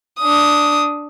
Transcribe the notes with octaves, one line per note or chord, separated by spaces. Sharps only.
D4 D#6